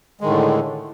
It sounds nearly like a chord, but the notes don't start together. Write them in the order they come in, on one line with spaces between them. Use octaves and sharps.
G#3 D#3 A2 D3